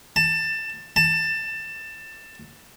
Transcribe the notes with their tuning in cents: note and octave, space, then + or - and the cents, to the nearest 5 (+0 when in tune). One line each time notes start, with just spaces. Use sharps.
A5 +20
A5 +20